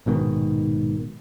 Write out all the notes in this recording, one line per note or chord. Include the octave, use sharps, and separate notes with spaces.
A#1 G#2 B2 D#3